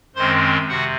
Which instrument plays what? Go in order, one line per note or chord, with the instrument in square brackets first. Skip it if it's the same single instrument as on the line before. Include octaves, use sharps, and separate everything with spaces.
[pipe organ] F#2 D#3 G#3 C4 C5 C6
C3 F#4 F#5